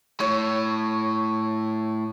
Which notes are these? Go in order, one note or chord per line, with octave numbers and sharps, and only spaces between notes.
A2 C#5